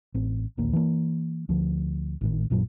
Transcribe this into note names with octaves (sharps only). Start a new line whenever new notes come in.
A1 C4
D1 A#1 D#2 A#3
E3 A#3
D2 F3
G#1 A2 D#3
A1 F#2 A#2 F#3